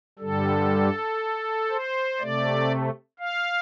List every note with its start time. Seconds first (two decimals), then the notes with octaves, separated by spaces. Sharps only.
0.19 G2 D3 G3 A4
1.70 C5
2.19 C3 A3 D5
3.20 F5